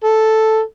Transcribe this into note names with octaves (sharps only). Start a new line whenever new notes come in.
A4